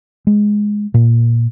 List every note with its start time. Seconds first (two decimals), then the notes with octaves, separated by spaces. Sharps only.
0.27 G#3
0.94 A#2